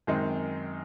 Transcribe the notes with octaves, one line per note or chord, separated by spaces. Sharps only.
F#2 D#3 G#3 C4 D#4